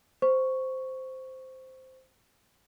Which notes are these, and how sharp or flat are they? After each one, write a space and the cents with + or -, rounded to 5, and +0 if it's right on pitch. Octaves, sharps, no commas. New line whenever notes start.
C5 -5 C#6 +0